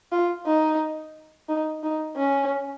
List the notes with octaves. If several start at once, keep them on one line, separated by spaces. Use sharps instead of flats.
F4
D#4
D#4
D#4
C#4